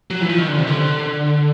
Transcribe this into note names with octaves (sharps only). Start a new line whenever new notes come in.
F#3
E3
F3
D#3
D3
C3
D3